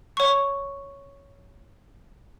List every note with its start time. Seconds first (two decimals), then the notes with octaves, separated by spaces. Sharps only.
0.17 C#5 C#6